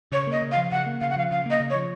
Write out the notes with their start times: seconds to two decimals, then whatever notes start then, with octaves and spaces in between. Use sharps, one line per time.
0.12 C#3 C#5
0.27 A#3 D#5
0.42 C#3
0.52 F5
0.57 F3
0.71 C#3 F#5
0.86 A#3
1.01 C#3 F5
1.09 F#5
1.16 F3 F5
1.31 C#3 F5
1.46 A#3 D#5
1.60 C#3
1.70 C#5
1.75 F3